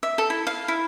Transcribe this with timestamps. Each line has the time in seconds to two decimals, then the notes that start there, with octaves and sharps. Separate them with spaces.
0.03 E5
0.18 A4
0.30 E4
0.47 F5
0.68 E4